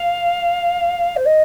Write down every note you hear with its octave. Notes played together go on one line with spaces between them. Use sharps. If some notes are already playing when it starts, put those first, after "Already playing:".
Already playing: F5
C5
D#5